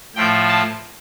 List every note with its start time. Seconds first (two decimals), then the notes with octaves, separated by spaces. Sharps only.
0.15 A2 F3 A3 G5
0.48 A5